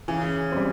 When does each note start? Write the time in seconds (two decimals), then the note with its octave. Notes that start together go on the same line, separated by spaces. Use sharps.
0.08 C#3 E3
0.52 G3 C4